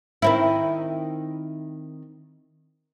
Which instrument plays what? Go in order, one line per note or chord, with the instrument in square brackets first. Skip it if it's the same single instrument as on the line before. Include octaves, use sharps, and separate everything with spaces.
[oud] D#3 C4 E4